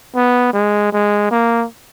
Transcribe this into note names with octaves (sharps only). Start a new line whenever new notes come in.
B3
G#3
G#3
A#3